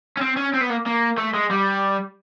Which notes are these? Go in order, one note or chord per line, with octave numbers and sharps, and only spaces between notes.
C#4
C4
C#4
C4
B3
A#3
A#3
A3
G#3
G3